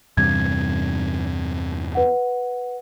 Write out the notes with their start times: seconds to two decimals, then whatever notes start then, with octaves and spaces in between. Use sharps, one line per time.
0.17 E2 G2 C3 G#6
1.95 B4 F#5